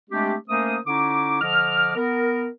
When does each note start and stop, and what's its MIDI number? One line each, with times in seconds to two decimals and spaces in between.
0.10 0.34 56
0.10 0.34 57
0.10 0.34 60
0.10 0.34 62
0.10 0.34 67
0.48 0.77 57
0.48 0.77 58
0.48 0.77 61
0.48 0.77 70
0.48 0.77 72
0.48 0.77 87
0.86 1.37 50
0.86 1.37 61
0.86 1.37 63
0.86 1.37 64
0.86 1.37 86
1.41 1.95 50
1.41 1.95 53
1.41 1.95 75
1.41 1.95 86
1.41 1.95 89
1.96 2.47 59
1.96 2.47 70